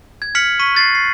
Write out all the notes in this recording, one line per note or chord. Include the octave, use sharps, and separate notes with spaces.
G#6
F6 B6 C#7 F#7
C#6 B6 D#7
F#6 A6 C7
C7